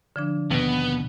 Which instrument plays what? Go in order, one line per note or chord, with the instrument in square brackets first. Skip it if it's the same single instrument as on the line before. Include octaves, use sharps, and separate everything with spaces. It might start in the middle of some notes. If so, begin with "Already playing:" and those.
[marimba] D3 F3 D4
[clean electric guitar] D#2 B2 [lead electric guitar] B3